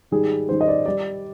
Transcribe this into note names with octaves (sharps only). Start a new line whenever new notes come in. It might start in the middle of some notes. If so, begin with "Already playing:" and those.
G#2 D#3 G3 G#4
G#2 D#3 G3 C5
D#5
D5
G3 D5